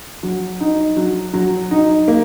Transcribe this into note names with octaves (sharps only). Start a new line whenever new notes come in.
F#3
D#4
F#3
F#3
D#4
A#3